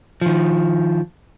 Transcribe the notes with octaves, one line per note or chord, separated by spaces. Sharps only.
D#3 F3